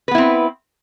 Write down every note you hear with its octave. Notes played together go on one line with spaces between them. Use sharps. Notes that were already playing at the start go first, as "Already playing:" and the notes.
B3 C4 E4 B4